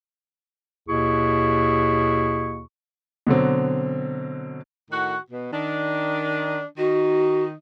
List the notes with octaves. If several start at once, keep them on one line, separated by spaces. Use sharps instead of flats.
D#2 B2 E4 G#4 C#6
B2 D3 F#3 C4
A2 D#3 F#4
B2
D#3 D4
D#3 D#4 F#4